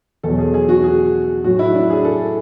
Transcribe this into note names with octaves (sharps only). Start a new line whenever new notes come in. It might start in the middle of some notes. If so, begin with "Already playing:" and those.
E2 B2 F#3 A4
G#4
G#4
F#4
G#4
A2 F#3 F#4
E4
D4
G#4
A4